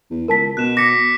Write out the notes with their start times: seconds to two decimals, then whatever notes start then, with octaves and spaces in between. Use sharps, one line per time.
0.10 E2
0.28 C#2 A#4 A5 B6
0.57 B2 F#6 E7
0.77 D6 A#6 B6 C#7